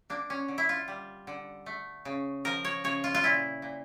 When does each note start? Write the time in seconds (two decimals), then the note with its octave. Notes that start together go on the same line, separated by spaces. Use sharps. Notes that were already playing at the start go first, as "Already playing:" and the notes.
0.10 A#3 D4
0.30 C#4
0.48 D3
0.58 E4
0.69 F4
0.88 G3
1.27 D3
1.66 A3
2.05 C#3
2.45 F3 A#4
2.65 C#5
2.84 C#3 C#5
3.04 F4
3.15 F4
3.23 A#2 E4
3.62 A#2